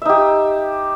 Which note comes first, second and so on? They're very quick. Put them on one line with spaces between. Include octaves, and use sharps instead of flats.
E5 D#4 G4